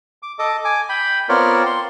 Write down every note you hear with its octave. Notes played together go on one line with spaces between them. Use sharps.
D6
A4 D#5 D6
G#5 D6
G5 B5
B3 C4 F4 A#4 C#5 D5
C6